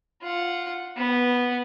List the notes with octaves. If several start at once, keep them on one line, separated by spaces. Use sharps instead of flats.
F4 F#5
B3